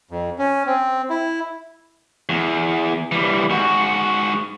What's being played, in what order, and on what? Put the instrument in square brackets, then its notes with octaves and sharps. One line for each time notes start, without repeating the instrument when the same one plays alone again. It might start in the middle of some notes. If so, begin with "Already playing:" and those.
[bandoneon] F2
C#4
C4
E4
[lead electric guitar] E2
E3 G3
G#2 F#4